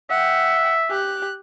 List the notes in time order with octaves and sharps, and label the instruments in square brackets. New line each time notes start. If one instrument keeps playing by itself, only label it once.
[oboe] E5 [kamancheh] F#5 G5
[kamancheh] G4 F#6